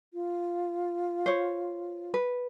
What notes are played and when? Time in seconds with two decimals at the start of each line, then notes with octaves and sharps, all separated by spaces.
0.14 F4
1.26 C5 C#5
2.14 B4